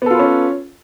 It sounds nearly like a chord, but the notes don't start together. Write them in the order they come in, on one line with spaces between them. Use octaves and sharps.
B3 A4 F4 B4 C#4